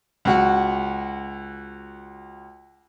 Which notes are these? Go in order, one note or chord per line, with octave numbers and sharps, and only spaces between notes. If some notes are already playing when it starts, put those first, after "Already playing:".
C#2 F#4 F#5